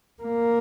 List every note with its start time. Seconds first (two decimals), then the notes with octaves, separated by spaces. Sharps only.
0.23 A#3